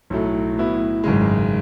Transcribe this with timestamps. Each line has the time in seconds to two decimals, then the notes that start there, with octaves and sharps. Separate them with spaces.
0.10 B1 A2 F#3 A3
0.57 A2 F#3 B3 E4
1.03 G#1 F#2 C#3 G#3